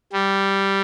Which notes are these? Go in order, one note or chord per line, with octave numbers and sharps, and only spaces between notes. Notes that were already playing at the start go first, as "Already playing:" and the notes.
G3